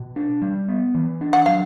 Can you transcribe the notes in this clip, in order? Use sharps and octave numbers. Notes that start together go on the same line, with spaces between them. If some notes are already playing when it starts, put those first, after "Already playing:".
Already playing: B2
D4
G3
B3
E3
D4
F#5
F#3 F5